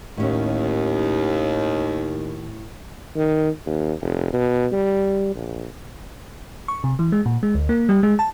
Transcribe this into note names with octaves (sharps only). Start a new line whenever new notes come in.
D#2 A2 C#4
D#3
D#2
F1
B2
G3
A#1
C#6
C3
E3
G#3
A#2
G#3
D2
A#3
G3
G#3
A5